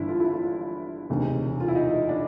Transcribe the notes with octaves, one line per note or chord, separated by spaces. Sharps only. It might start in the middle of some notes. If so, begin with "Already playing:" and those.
Already playing: G1 G2 E3 E4
F4
E4
F4
E1 D2 C3 D#3
F4
E4
D#4
D4